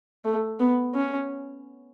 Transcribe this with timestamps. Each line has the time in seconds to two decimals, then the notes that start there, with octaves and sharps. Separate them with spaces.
0.25 A3
0.60 B3
0.94 C#4